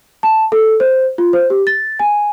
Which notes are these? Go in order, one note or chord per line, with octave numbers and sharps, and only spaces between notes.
A5
A4
C5
F4
C5
G4
A6
G#5